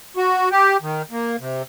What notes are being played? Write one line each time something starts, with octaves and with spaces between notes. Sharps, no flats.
F#4
G4
D#3
A#3
C3